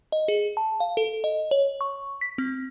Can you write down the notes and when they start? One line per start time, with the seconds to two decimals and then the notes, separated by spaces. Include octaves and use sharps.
0.12 D#5
0.28 G#4
0.57 A5
0.80 F5
0.97 A4
1.24 D#5
1.51 C#5
1.81 C#6
2.21 B6
2.38 C4